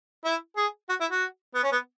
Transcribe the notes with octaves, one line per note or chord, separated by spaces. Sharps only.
E4
G#4
F#4
E4
F#4
B3
C#4
B3